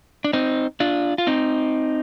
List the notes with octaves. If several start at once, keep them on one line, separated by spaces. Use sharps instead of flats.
D4
C4 D#4
D4 F4
F4
C4 D#4